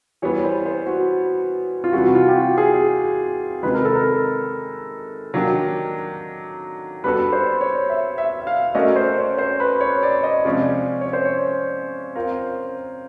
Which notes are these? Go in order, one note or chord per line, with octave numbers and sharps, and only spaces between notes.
E3 G3 B3 C#5
C5
C5
F#4
F4
C3 E3 G3 F#4
F#4
F4
G4
F#4
G#4
C3 D#3 G#3 B4
A#4
A4
A#4
D#3 F#3 A#3 D4 G4
G3 B3 D4 F#4 A4 B4
C5
C#5
E5
E5
E5
F5
A3 C#4 F#4 A#4 D5 D#5
C5
C#5
C5
B4
C#5
D5
D#5
C3 F3 G#3 C#4 D5
C#5
C5
C#5
C4 F4 A#4